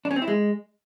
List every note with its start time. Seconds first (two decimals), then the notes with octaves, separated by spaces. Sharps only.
0.05 D4
0.11 C#4
0.16 C4
0.22 E4
0.28 G#3